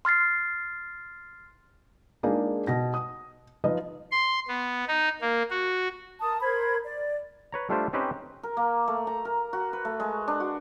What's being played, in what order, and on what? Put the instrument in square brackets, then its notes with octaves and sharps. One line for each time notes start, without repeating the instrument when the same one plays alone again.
[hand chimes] C6 F6 A6 C7
[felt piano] G#3 A#3 D4 D#4 F4 G#4
B2 A#6
D#6
F3 D#4 F4 B4 D#5
[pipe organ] C6
B3
D#4
A#3
F#4
[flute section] A#4 A5 D#6
A#4 C5 B5 G#6
D5
[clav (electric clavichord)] B4 C#5 A#5
G3 A3 D4 F4 G4 C5
C4 C#4 D#4 G4 B4 C5
[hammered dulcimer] A#4
A#3
A3
A#5
A#4
F#4
B4
A3
G#3
D4
F#4